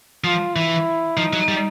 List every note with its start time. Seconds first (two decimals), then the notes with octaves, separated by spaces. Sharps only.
0.24 F3 F4
0.55 E3 E4
1.17 F3 D#4
1.33 F#3
1.48 G3